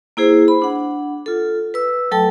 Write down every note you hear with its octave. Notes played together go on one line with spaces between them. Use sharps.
A#3 E4 G#4 C5
B5
D4 F#5
F4 A4
B4 E6
F#3 A3 A4 G5 A5